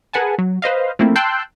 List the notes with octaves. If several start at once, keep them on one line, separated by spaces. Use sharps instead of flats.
G#4 A#4 B4 F#5 G#5 A5
F#3
B4 C5 D#5 F5
F3 A3 A#3 C4 E4
G5 A5 C6 E6 F#6 G6